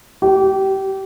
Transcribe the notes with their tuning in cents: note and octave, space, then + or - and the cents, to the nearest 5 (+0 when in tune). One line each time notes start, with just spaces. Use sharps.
G4 -25